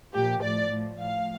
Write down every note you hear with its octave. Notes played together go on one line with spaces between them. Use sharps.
A#2 F3 G4
A2 F3 D5
A2 F3
A2 F3 F5